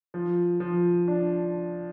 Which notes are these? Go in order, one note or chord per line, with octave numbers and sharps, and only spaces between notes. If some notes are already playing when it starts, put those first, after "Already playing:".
F3
F3
D4